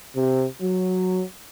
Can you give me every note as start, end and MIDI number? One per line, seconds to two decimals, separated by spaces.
0.15 0.44 48
0.61 1.21 54